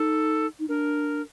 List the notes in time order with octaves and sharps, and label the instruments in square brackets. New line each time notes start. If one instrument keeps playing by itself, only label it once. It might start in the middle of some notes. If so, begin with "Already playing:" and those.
Already playing: [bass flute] D#4 [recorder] A4
[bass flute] D#4
[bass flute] D4 [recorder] A#4